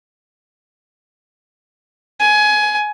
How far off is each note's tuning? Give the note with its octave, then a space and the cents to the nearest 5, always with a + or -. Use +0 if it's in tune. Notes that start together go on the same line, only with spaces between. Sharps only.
G#5 +20